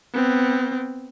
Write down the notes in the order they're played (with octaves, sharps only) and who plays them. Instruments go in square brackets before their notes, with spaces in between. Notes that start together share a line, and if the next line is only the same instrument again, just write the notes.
[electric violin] B3 C4